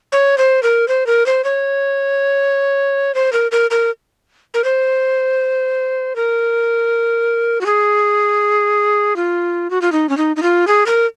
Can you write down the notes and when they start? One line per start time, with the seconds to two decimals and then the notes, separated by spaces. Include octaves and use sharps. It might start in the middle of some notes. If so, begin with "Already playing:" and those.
0.12 C#5
0.38 C5
0.63 A#4
0.88 C5
1.07 A#4
1.26 C5
1.44 C#5
3.15 C5
3.33 A#4
3.52 A#4
3.71 A#4
4.54 A#4
4.64 C5
6.16 A#4
7.61 F#4
7.66 G#4
9.16 F4
9.70 F#4
9.82 F4
9.92 D#4
10.09 C#4
10.17 D#4
10.36 D#4
10.42 F4
10.67 G#4
10.86 A#4